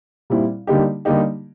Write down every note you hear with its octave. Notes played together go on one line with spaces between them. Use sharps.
A#2 G3 C4 E4
D3 G3 A#3 D#4 G4
D3 G3 A#3 D#4 G4